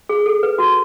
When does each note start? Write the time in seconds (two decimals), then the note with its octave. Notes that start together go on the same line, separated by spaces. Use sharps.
0.09 G#4
0.26 A4
0.43 B4
0.58 F#4